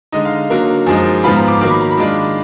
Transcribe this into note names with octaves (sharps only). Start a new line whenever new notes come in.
D3 G#3 D#4 D#5
F5
D3 F#3 A#3
F#2 F3 G#3 D#4
G#2 F3 B3 F4 B5
A#5
D6
D#3 F#3 A#3 D6
B5
A#5
B5
D#3 G#3 D4 F4